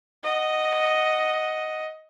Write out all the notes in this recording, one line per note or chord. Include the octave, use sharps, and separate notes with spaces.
D#5 F#5